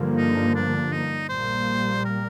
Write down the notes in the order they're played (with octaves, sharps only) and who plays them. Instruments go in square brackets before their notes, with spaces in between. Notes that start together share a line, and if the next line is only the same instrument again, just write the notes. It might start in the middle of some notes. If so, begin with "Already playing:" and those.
Already playing: [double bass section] G2 D3 F3 A#3
[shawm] D#4
D4
D#4
[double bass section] A#1 A#2 G3 A#3 [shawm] C5
[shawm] A#4